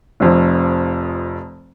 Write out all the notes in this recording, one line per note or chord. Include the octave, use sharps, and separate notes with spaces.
F1 F2 F3